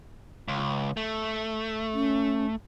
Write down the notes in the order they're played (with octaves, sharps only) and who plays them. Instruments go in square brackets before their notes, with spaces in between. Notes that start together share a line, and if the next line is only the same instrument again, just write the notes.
[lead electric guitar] C#2
A3
[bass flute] C#4